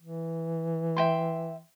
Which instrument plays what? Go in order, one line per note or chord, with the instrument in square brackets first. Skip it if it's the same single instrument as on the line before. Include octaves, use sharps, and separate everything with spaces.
[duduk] E3
[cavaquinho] E5 G5 C6